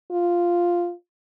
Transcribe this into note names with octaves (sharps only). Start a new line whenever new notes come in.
F4